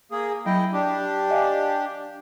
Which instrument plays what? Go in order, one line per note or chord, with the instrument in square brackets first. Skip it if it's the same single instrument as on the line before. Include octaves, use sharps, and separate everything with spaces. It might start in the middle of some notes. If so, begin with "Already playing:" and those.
[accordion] A#3 G#4
[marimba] F#3 [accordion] E4 D#5 G5
[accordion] D4 G4
[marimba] D#5 F5 G#5